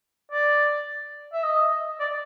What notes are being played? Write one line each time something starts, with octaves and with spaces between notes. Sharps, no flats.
D5
E5
D#5
D5